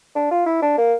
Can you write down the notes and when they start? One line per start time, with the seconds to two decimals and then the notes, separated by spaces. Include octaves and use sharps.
0.15 D4
0.31 F4
0.46 E4
0.62 D4
0.78 A#3